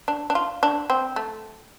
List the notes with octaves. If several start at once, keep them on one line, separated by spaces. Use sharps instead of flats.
D4
D4
F4
D4
C4
A3